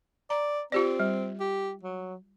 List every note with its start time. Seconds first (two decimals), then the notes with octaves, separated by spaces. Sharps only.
0.30 D5 A#5
0.72 C4 F4 G4 D5
1.00 G3
1.40 G4
1.83 F#3